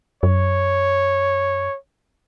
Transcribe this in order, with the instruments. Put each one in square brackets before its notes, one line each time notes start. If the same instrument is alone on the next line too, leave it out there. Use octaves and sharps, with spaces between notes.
[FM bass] F#2 [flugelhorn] C#5